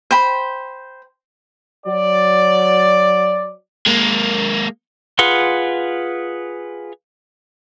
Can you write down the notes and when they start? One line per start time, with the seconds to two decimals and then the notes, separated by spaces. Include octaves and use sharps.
0.11 C5 G5 B5
1.87 F#3 D5
3.87 G#3 A#3
5.19 F4 G#4 B4 F#5 C6